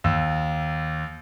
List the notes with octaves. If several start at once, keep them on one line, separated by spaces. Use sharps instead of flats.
D#2 E6